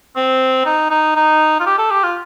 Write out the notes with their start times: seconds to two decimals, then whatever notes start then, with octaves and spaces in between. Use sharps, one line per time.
0.16 C4
0.66 D#4
0.91 D#4
1.16 D#4
1.60 F4
1.66 G4
1.78 A4
1.91 G4
2.04 F4